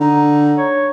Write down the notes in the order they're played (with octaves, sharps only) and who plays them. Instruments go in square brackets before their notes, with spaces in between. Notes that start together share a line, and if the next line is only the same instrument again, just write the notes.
[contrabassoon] D3 [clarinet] D#4
[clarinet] C#5